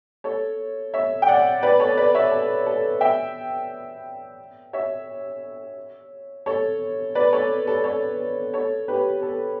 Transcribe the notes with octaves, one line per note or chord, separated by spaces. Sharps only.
A4 C#5
C#5 E5
G5
D5 F#5
B4 D5
A4 C#5
B4 D5
C#5 E5
A4
A4
E5 G5
C#5 E5
A4 C#5
B4 D5
A4 C#5
A4
A4 C#5
A4 C#5
G4 B4
A4